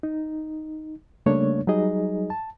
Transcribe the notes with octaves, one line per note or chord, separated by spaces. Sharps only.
D#4
C#3 G3 A3 A#3 D4 C#5
F#3 G3 D#4 G#4 D#5
A5